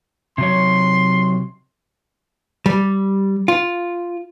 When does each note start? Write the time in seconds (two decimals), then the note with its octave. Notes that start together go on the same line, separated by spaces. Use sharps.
0.38 C3 F#3 C#5 C6
2.66 G3
3.48 F4